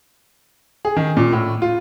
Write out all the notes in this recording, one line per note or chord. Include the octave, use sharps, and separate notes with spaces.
G#4
D#3
A#2
A2
F4